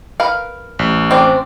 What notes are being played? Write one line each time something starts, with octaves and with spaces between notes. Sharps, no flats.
A#4 B4 F5
A1
C4 D4 C5